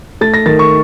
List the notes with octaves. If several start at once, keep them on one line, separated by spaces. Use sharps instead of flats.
A3 A6
A#6
D#3 A6
C#6